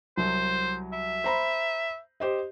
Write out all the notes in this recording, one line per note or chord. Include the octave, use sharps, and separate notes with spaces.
C2 F#3 C5
E5
C5 A#5 B5
G4 C5 D#5